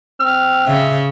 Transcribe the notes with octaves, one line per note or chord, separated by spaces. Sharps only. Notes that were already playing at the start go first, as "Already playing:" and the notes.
C4 F6
C#3 E5